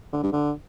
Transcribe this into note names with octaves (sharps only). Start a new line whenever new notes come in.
D3
G2
D3